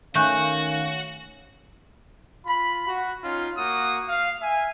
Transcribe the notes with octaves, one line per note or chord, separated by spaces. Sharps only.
D#3 A3 C#4 F#4 F5 G#5 F#6 G6
F4 B5
F#4
C#4 D#4 F4
A#3 F#4 D#6
F5
E5 G#5